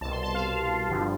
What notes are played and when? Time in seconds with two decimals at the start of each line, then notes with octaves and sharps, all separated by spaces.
0.01 C2 A5
0.05 B2
0.11 C6
0.23 A5
0.34 F5
0.89 G1 G2 D3 F3